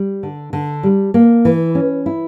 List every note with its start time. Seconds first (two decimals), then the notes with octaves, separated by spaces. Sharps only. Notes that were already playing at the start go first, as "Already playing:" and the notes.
Already playing: G3
0.23 D3
0.53 D3
0.83 G3
1.14 A#3
1.45 E3
1.75 C#4
2.06 E4